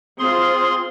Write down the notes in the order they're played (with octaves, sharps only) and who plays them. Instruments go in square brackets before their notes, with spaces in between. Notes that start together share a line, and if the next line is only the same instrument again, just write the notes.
[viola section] C4 F4 [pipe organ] G#4 C6